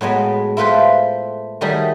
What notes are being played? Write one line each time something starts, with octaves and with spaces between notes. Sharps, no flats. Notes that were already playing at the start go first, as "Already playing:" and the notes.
A2 F#3 G#3 B3
E4 F4 A4 B4 C5
D#3 F#3 G3 A3 G#4